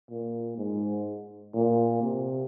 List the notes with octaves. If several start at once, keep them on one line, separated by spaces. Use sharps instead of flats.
A#2
G#2
A#2
C3